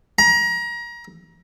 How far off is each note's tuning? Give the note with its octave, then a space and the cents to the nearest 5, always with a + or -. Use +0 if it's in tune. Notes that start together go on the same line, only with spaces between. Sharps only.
A#5 +30